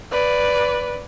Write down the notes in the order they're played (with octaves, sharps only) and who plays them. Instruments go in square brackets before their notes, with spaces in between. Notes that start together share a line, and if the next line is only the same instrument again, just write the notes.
[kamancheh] B4 D5